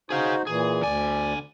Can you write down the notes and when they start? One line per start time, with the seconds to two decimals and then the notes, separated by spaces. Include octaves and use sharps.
0.10 D#4 F#4 G#4 C5 F5
0.47 A#2 E3 G#4
0.82 D2 D3 D5 G#5